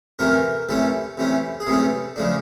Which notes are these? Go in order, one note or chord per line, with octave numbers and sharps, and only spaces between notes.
C3 E3 A3 C#4 A#4
C3 E3 A3 C#4 A4
C3 E3 A3 C#4
G#4
C3 E3 A3 C#4 A4
C#3 F3 A3 D4